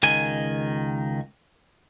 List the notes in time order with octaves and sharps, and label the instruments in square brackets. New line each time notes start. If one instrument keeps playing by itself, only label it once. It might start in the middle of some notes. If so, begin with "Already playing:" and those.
[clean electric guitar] C#2 D#3 G#5